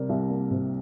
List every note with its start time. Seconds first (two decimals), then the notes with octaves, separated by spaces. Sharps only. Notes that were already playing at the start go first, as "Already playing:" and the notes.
Already playing: C3 G3 A#4 D5
0.09 C2
0.30 A#3
0.51 C3